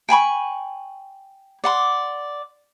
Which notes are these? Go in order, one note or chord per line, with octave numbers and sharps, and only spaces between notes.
G5 G#5 B5 C#6
D5 F#5 C6